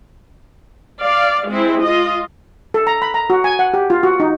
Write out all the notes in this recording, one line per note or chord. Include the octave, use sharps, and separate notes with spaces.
D5 F5
G#3 C4 E4
F4 D#5
A4
A#5
B5
A#5
F#4
G#5
F#5
G4
F4
F#4
D#4